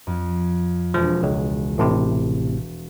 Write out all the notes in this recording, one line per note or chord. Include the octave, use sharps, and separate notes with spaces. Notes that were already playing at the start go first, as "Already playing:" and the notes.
F2
E1 F3 G#3
C#2
A1 A2 C3